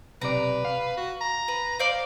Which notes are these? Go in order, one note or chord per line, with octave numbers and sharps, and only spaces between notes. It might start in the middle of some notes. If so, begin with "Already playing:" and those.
B1 C3 B4 D5 A#5
F5
F#4
A#5
B4
C5 D5 F5